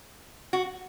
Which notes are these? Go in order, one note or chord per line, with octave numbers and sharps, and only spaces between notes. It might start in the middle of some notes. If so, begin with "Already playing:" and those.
F#4